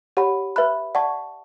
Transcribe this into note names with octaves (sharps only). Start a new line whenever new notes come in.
G4 C#5 F#5 B5
B4 E5 B5 F#6
D5 F#5 A5 C#6